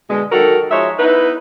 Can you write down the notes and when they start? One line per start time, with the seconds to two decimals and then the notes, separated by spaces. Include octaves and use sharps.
0.09 B2 D3 G#3
0.32 D#3 F#3 F#4 A4 A#4
0.71 F3 G#3 D#4 C#5 E5
0.99 B3 D#4 E4 B4